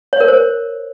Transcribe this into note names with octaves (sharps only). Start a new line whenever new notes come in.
C#5
A#4
C5